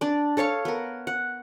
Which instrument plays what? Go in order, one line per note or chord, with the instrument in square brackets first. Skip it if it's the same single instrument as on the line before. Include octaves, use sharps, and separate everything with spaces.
[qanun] D4 D5
A4 C#5 F5 C#6
B3 A#4
F#5